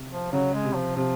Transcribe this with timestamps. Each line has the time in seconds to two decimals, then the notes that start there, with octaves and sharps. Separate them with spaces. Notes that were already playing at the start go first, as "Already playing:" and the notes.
Already playing: C3
0.11 F3
0.32 C#3 F#3
0.53 G#3
0.64 C3
0.75 F3
0.96 C3 F3